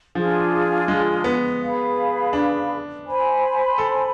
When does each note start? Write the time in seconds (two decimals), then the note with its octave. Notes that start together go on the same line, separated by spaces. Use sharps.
0.15 F3 D4 F4 G#4
0.88 G#3
1.24 B3
1.60 G#4 B4 F5 B5
2.33 D4
3.06 C5 G#5 B5
3.78 A4